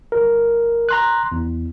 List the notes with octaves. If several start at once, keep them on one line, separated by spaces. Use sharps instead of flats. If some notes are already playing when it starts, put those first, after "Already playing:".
G1 A#4
A#5 C6 F#6
E2